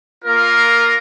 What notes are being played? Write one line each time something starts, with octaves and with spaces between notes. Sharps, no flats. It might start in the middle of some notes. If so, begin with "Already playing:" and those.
A#3 F4 A#4